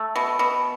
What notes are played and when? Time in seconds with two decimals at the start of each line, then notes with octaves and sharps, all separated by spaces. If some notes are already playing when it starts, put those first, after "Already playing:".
Already playing: A3
0.16 B2
0.39 B2